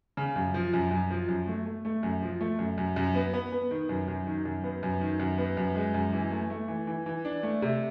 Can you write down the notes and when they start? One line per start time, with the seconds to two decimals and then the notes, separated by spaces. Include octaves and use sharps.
0.17 C#3
0.36 F#2
0.54 F3
0.73 F#2
0.91 F#2
1.10 F3
1.28 F#2
1.47 A3
1.66 A3
1.85 A3
2.03 F#2
2.22 F3
2.41 A3
2.59 F#2
2.78 F#2
2.96 F#2
3.15 B3
3.34 B3
3.52 B3
3.71 D#3
3.89 F#2
4.08 F#2
4.27 D#3
4.45 F#2
4.64 B3
4.83 F#2
5.01 D#3
5.20 F#2
5.38 B3
5.57 F#2
5.76 G#3
5.94 F#2
6.13 E3
6.31 A3
6.50 A3
6.68 E3
6.87 E3
7.06 E3
7.25 D4
7.43 A3
7.62 C3